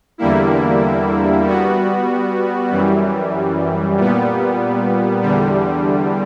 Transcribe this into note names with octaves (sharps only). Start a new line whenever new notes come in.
E2 D3 G3 A#3 E4
G3 B3 F#4
F#2 E3 G3
A#2 G3 B3
E2 D3 G3